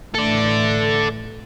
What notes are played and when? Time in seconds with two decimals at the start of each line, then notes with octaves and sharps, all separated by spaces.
0.15 A2 E3 A3 A4 D5